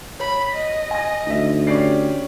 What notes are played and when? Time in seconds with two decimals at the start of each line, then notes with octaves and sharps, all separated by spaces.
0.20 C#5 B5
0.53 D#5
0.91 G#5 A#6
1.26 D2 D#4 E5
1.67 C#4 G4 D5 C7